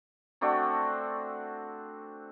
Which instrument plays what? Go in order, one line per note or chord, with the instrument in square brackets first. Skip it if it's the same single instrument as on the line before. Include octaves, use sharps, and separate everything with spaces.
[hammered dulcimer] A3 C4 D4 F#4